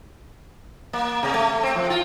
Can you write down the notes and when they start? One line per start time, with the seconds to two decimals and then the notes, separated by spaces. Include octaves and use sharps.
0.93 A#3
1.23 C3
1.34 A3
1.63 C4
1.75 F3
1.90 F4